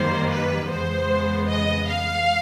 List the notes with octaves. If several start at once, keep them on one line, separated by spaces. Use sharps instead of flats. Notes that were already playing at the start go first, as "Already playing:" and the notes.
Already playing: F#2 D#3 G3 A#3 C5
B4
F2 C#3 E3 G#3 B3 C5
D#5
F5